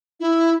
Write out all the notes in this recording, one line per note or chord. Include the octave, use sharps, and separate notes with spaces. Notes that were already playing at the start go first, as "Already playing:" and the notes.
E4